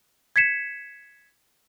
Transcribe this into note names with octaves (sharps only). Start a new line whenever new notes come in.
G#6 B6 C#7 E7